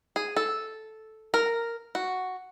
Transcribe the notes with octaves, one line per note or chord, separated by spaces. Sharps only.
G#4
A4
A#4
F#4